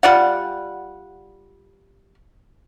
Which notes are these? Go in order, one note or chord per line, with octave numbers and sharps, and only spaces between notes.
G3 F4 D5 F#5